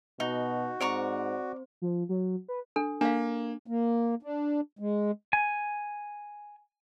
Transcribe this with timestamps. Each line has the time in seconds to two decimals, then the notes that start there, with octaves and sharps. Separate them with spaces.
0.20 B2 D#4 F#4
0.81 G#2 C4 C5 D5 A#5 C#6
1.82 F3
2.09 F#3
2.48 B4
2.76 D4 A4
3.01 A#3 D4 F5
3.67 A#3
4.23 D4
4.79 G#3
5.33 G#5